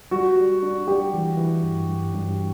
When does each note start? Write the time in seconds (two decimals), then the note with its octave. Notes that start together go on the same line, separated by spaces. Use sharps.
0.11 G3 F#4
0.36 G3
0.63 D4
0.87 G3 G4
1.13 E3
1.38 E3
1.63 G2
1.88 G2
2.14 G2